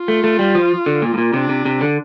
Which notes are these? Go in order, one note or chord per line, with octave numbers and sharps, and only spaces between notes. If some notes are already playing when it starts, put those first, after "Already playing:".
Already playing: F4
A3
A3
G3
F3
D3
A#2
A2
A#2
C3 D4
C3
C3
D3